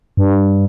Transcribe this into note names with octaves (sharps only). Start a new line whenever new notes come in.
G2